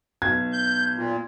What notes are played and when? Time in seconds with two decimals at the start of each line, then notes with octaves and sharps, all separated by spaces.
0.22 B1 G#6
0.53 G6
0.95 A#2